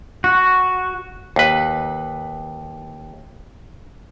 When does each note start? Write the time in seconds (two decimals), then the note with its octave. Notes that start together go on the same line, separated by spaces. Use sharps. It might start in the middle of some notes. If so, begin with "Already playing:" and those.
0.24 F#4
1.36 D#2 B4